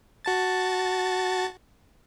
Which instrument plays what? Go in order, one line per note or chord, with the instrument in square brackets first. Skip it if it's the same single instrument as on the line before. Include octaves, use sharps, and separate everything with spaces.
[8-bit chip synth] F#4 A5 A6